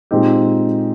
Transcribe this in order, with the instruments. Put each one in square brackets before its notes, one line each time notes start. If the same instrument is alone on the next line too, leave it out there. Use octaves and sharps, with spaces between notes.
[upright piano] A#2 G#3 C4 D#4 G4